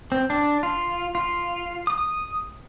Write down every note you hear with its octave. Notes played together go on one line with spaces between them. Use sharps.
C4
D4
F4
F4
D#6